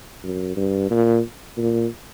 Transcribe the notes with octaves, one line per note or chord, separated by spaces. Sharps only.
F#2
G2
A#2
A#2